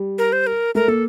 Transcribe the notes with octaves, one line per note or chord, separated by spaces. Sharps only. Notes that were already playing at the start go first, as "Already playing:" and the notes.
Already playing: G3
A#4
C5
A#4
A3 A#4
A#3 A4